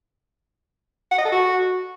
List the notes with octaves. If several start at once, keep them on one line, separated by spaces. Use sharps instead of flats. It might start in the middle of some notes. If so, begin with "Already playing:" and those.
F#5
D#5
A4
F#4